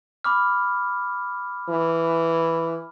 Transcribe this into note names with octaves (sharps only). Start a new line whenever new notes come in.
B5 D6 F6
E3